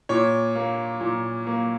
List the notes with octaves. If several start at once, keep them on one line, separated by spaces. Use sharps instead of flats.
A#2 C#5
A#3
A#2
A#3